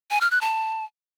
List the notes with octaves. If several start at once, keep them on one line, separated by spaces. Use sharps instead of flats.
G#5
F6
F#6
A5